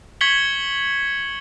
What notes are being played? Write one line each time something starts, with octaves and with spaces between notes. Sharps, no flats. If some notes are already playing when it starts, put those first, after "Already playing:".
C#6 G#6 B6 C#7 F#7 G7